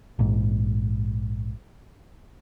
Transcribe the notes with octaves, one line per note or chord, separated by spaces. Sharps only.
A#1 G#2